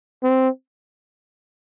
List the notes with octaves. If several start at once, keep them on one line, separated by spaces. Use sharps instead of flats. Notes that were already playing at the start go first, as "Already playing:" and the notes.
C4